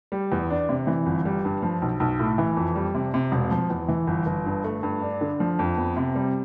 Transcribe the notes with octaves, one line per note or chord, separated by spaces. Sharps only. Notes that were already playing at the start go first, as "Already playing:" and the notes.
G3
E2
D4
C3
E3
G1
G3
G2
F3
B1
B1
A2
E3
F2
G3
C3
C3
E1
F3
E2
E3
G1
G1
G2
A3
G2
D4
D3
F3
F2
B3
C3
G3